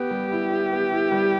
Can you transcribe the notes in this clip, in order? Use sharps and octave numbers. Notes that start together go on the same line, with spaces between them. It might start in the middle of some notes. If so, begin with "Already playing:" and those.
Already playing: B3 G4
G3
E4
E4
B3
E4
G3